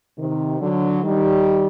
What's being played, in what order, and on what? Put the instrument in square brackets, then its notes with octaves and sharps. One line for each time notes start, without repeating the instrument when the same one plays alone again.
[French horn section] C3 D#3
D3 F#3
D#3 G3